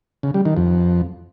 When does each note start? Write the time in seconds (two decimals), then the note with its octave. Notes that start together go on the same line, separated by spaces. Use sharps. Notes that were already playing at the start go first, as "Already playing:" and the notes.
0.23 C#3
0.34 G3
0.45 D#3
0.57 F2